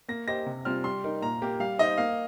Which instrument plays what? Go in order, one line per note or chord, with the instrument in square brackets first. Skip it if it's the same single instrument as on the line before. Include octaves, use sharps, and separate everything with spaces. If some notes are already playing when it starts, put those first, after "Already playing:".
[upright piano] A#3 [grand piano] A#6
[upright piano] G4 C5 D#5 [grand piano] A#6
[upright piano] C3
[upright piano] G3 C4 F4 [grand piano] F6
[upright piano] G3 [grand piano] C6
[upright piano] D#4 A#4
[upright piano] A#2 [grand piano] A#5
[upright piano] A#3 G4 A#4
[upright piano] G3 [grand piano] F5
[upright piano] D#4 C5 [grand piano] D#5
[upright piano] A#3 [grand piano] F5